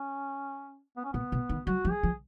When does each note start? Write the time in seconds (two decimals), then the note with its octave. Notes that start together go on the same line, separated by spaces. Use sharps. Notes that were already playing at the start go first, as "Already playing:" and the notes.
Already playing: C#4
0.97 B3
1.04 C#4
1.13 A#2 B3
1.32 B2
1.49 D#3
1.67 F#3 F#4
1.85 F3
1.91 G#4
2.03 F3